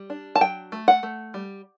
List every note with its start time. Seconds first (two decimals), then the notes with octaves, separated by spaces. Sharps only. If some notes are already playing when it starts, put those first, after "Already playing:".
Already playing: G3
0.10 D4
0.35 A5
0.41 F#3 G5
0.72 A3
0.88 F#5
1.03 A3
1.34 G3